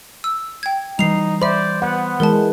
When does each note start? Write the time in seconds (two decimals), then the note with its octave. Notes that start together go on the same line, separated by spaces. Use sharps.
0.24 E6
0.63 G5 G#6
0.99 E3 G3 D#4 C7 F7
1.42 C5 D5 E5 B5
1.82 B3 F#5
2.20 E3 G#3 A#4 A5